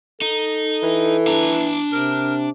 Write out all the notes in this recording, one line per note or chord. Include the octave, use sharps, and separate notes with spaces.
D#4 A4
E3
D4 A#5
C3 A#4